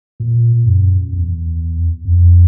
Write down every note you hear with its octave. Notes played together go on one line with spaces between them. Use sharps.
A#2
F#2
E2
F2